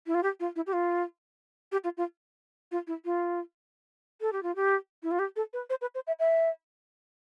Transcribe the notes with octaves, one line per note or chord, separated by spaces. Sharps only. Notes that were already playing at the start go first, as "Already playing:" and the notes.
E4
F4
G4
F4
E4
G4
F4
G4
F4
F4
F4
E4
F4
A4
G4
F4
G4
E4
F4
G4
A4
B4
C5
B4
C5
E5
E5